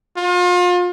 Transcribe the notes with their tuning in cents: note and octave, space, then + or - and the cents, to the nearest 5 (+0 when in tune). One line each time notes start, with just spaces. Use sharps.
F4 +35